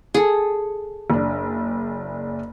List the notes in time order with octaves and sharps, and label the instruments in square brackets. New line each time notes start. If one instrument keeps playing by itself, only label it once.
[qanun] G#4 A4
[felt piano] F#1 D4